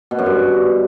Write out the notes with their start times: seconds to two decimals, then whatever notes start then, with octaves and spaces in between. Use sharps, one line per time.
0.11 B2
0.19 F#2
0.26 G2